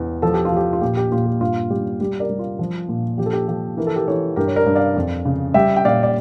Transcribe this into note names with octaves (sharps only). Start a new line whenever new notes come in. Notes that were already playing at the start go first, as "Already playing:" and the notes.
Already playing: E2
F3 A4
G4
F4
F3 G4
F4
A#2 G4
G4
A#2 F4
G4
G2 F4
G3 G4
G3 G4
A#4 D5
G3
F4
F3
A#2
F3 G4
A4
G4
F3 G4
E3 A#4
A4
G4 A#4
E3 A4 C#5
G2 G4 A#4
C#5
A#4 D5
G2
D5 F5
F2
C#3
G3 E5 G5
G5
A#2 D5 F5
D5